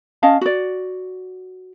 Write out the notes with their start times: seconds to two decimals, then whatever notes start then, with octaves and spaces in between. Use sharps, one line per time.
0.23 C#4 D#5 F5 A5
0.41 F#4 D5